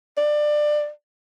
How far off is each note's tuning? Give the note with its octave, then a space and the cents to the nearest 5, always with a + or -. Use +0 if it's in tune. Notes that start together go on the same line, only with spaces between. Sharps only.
D5 +20